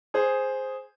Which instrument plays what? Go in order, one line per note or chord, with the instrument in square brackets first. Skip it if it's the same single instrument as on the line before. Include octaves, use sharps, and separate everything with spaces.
[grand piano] G#4 C5